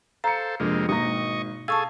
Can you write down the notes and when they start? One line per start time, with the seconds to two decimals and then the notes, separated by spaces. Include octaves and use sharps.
0.24 A4 C5 F5 A#5 C#7
0.60 F2 C3 G#3 A#3 D4
0.89 G#1 B2 A#3 D#5 C#6 A#6
1.68 G#4 A4 F5 G#5 A5 C#6 E6